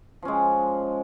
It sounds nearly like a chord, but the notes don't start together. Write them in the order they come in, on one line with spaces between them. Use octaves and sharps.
F3 C#4 G#3